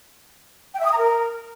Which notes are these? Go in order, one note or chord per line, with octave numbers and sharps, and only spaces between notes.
G5
E5
D#6
A#5
A#4